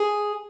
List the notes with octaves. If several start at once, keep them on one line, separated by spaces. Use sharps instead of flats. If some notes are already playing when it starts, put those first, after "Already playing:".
Already playing: G#4